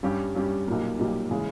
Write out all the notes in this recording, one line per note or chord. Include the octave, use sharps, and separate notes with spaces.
G2 G3 C#4 G4
G2 G3 C#4 G4
B1 A#2 G3 A#3
B1 A#2 G3 A#3
C#3 E3 G#3